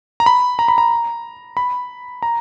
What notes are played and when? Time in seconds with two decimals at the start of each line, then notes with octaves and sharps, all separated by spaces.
0.20 A#5
0.26 B5
0.59 A#5
0.68 B5
0.78 A#5
1.57 B5
2.23 A#5